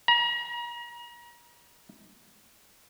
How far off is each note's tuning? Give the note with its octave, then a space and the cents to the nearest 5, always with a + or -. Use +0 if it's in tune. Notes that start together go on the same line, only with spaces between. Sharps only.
A#5 +35